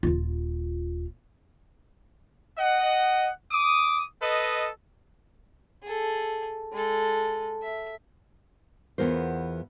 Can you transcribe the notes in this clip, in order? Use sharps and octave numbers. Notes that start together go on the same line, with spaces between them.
D#1 F4
D#5 F#5
D6 D#6
A4 B4 D#5
G#4 A4
G#3 A4
E5
E2 B3 F4 A#4 C5